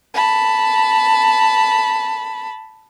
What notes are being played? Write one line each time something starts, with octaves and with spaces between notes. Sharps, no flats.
A5 B5